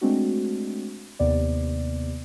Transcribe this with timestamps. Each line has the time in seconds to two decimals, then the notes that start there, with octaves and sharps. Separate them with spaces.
0.01 G#3 A3 C4 D4 F#4
1.19 D#2 C3 B3 D5